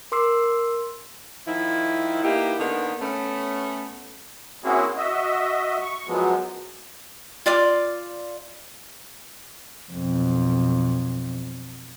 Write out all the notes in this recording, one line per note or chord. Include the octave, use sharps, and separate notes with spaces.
A#4 C6 D6 E6 C7
D#3 F3 E4
A#3 B3 D#4 E4 G4
D3 D#3 A#3 B3
A3 B3 C#4
A#3 C4 C#4 E4 F#4 G#4
F#4 D#5 E5
C#6
F#2 F3 F#3 G#3 B3
F4 D5 F5 D6
B1 F2